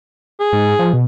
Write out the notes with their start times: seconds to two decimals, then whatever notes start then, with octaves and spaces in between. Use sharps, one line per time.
0.40 G#4
0.53 G#2
0.79 F3
0.93 B2